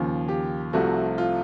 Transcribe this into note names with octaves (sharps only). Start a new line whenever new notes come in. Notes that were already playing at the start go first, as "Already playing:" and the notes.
Already playing: D#2 C#3 F3
G4
C2 C3 F3 A3 F#4
F4